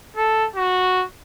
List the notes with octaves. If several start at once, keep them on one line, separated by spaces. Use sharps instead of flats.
A4
F#4